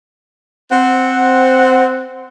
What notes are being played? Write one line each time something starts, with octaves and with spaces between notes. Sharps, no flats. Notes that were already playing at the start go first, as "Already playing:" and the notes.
C4 F#5